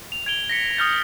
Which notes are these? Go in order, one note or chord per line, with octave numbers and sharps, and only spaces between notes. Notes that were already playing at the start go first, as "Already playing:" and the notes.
F7
G#6 D7 F7 G7
A#6 B6 C#7
D#6 F6 G6 A6